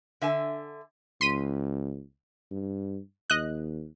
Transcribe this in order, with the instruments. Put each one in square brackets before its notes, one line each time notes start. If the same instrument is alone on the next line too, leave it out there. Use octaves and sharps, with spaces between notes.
[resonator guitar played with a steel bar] D3 E5 G#5
[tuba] C#2 [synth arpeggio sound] C6 B6 D#7
[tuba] G2
[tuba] D#2 [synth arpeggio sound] D#5 F#6